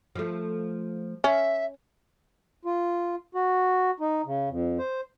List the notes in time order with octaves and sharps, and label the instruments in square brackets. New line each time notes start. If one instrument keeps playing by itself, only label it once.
[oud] F3 A3
[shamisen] C#4 [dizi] E5
[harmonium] F4
F#4
D#4
C#3
F2
C5